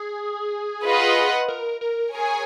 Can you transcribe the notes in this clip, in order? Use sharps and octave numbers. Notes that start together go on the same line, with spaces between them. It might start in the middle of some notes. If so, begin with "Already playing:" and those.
Already playing: G#4
F4 B4 D#5 F#5
A#4
A#4
G#4 A#4 C#5 G#5